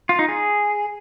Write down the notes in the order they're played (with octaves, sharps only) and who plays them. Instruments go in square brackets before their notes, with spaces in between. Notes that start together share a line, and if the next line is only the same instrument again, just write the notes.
[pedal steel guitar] F4
D#4
G#4